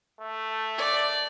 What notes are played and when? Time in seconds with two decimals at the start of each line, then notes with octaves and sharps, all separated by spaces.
0.20 A3
0.78 D5